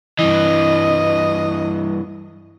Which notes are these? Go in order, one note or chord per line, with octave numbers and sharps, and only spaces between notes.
G2 E3 D#5